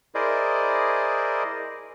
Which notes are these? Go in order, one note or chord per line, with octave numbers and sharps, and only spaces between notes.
E4 G#4 A#4 C5 D5 D#5